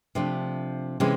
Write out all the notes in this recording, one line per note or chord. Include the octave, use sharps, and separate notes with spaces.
C3 F3 A3 D4
C3 E3 G#3 C#4